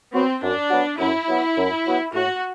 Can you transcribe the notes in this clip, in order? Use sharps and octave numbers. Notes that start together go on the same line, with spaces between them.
F#3 B3 C4 F#4
F#2 D4
F#3 B3 F#4
F#2 E4
F#3 B3 F#4
F#2
F#3 B3 F#4
A2 F#4